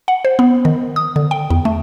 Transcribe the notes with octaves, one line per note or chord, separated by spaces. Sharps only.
F#5
C5
B3
D#3
D#6
D3
G5
E2
A3